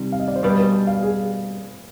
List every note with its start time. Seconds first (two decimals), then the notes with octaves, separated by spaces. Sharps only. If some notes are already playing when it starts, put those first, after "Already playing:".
Already playing: C3 D#3 G3
0.12 F5
0.20 D#5
0.28 D5
0.36 C5
0.43 B2 G3 D4 B4
0.58 B4
0.87 F5
1.03 G#4